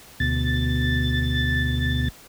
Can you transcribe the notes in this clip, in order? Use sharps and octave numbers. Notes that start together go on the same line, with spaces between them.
D2 B2 A6